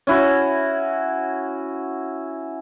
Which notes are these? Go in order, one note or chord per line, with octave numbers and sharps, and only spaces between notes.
C#4 E4 F#4